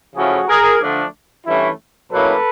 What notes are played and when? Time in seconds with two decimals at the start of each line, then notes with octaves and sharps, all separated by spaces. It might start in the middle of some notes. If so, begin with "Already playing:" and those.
0.16 C#3 F3 A3 C#4 E4 F#4 G#4
0.48 G#4 A#4
0.81 D3 F3 A3 D4
1.46 G2 E3 A3 C#4 E4
2.11 B2 F#3 A#3 C#4 E4 A4 B4